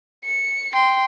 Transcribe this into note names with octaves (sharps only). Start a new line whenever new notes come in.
C#7
G5 C6